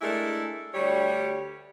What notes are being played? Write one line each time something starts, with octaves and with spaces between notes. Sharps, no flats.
G#3 A3 D4 E4 A4 A#4
D2 G3 C#5